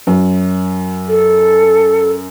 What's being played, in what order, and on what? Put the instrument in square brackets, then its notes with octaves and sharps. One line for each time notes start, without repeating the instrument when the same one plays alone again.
[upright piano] F#2
[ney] A4